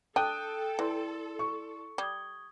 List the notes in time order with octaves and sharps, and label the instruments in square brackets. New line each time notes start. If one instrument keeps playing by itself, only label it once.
[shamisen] D4 [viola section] A4 [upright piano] G5 [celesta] D#6 F#6 D#7
[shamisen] E3 [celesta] E4 D5 C6
[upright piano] C#6
[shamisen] G3 [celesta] D#6 G#6 G7